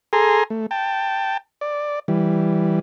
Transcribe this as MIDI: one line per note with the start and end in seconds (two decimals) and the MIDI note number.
0.13 0.44 68
0.13 0.44 69
0.13 0.44 80
0.13 0.44 82
0.13 0.44 84
0.50 0.66 57
0.71 1.37 79
0.71 1.37 81
1.61 1.99 74
2.08 2.79 52
2.08 2.79 55